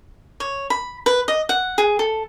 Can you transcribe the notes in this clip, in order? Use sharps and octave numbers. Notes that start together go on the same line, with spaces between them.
C#5
B5
B4
D#5
F#5
G#4
A4